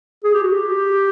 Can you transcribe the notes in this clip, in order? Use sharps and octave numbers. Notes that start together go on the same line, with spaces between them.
G#4
G4
F#4
G4